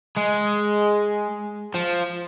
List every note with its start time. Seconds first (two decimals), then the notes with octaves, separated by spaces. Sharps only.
0.16 G#3
1.75 F3